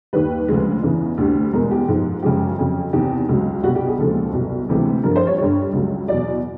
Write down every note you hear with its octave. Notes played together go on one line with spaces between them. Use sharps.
D#2 D#3 G3 B4
D2 C#3 F3 G#3
E2 C#3 E3
D2 D3 G3
E2 B2 G#3 A#4
G4
G#2 F3 G#3
F#2 C#3 F3 G#3 G4
F2 C#3 F#3
E2 C3 D#3 G4
C#2 C#3 F#3
C2 B2 G3 F#4
G4
G#4
D#2 C#3 F3 G#3 A4
C2 B2 F#3
D2 C3 E3 G#3
G2 D3 F3 A#4
C5
C#5
G2 D3 G3 C#5
C#2 C#3 F#3
E2 B2 F#3 D5